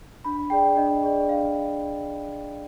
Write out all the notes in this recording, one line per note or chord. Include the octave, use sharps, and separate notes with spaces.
D4 B5
G#4 D5 G5
D4 D#5
G#4 D5
D4 F5